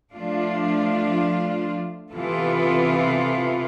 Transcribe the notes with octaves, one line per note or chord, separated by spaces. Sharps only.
F3 A3 D4 F4
C3 E3 B3 F4 A4